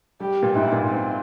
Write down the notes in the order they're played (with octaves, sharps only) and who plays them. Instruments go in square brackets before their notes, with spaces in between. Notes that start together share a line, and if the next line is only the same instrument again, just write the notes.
[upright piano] G3 [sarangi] G4
[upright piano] A#2
[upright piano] G#2 [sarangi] E4
[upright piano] A#2
[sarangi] C4